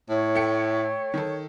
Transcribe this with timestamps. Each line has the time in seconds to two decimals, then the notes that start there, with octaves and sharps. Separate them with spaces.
0.09 A2 C#5
0.35 A3 G5 C#7
1.14 D#3 A4